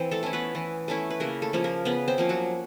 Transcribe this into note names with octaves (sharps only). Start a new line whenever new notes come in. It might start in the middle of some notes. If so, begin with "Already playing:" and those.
Already playing: E3 C4 C5
A3 A4
A3 C#4 E4
B3 B4
E3
A3 C#4 E4
B4
C#3 A#3 A#4
A3 A4
F3 A#3 C#4
A#3 A#4
C#3 B3 B4
C4 C5
F3 A#3 C#4
F#3 F#4